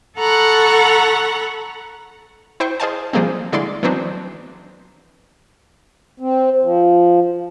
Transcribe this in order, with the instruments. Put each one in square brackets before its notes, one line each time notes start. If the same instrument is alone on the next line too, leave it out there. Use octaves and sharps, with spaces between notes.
[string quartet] A4 F#5 A#5 B5 C#6
[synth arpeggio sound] E4 C5 G5 C#6
G#4 C5 D#5 F5 G#5 A5
F3 G3 G#3 A#3 C4
D3 G#3 E4 D5 C6
E3 F#3 B3 C4 D4 D#4
[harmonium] C4
F3